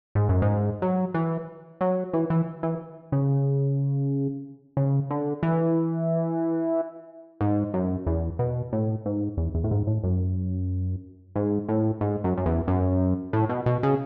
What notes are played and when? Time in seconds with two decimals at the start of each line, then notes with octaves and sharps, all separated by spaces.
0.15 G#2
0.29 F#2
0.42 G#2
0.82 F#3
1.14 E3
1.81 F#3
2.13 E3
2.30 E3
2.63 E3
3.12 C#3
4.77 C#3
5.11 D3
5.43 E3
7.41 G#2
7.74 F#2
8.07 E2
8.39 B2
8.73 A2
9.06 G#2
9.37 E2
9.55 E2
9.64 A2
9.71 G#2
9.87 A2
10.04 F#2
11.35 G#2
11.68 A2
12.01 G#2
12.24 F#2
12.38 F#2
12.46 E2
12.68 F#2
13.33 A2
13.49 B2
13.66 B2
13.83 C#3